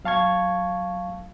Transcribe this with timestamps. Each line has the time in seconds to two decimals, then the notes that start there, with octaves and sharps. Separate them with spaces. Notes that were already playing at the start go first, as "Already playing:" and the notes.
0.05 F#3 F5 A5 C#6 G#6